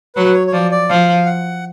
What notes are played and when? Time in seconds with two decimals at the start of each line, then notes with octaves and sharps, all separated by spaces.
0.16 F#3 B4
0.34 C#5
0.47 C#5
0.52 F3 D5
0.71 D5
0.90 F3 F5
1.26 F#5